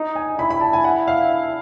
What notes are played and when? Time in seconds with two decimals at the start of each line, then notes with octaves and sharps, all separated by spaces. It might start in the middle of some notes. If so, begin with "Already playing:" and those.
Already playing: D#4
0.15 G#5
0.38 E4 B5
0.50 B5
0.61 A5
0.73 G#5
0.84 F#5
1.07 F5